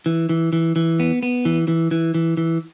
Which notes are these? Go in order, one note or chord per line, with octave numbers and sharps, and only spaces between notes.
E3
E3
E3
E3
B3
B3
E3
E3
E3
E3
E3